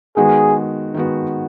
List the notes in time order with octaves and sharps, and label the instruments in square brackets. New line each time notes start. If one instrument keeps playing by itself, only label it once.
[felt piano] D#3 G#3 B3 F#4 [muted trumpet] G#4
[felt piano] D#3 G#3 B3 F#4